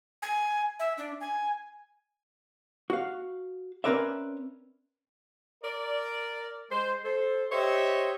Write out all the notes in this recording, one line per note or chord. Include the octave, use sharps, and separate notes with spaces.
G#5
E5
D4
G#5
F#4 F5
C4 C#4 A#4 B4 D5 E5
A#4 D5
G#3 C5
A4 C5
G4 C5 C#5 D#5 E5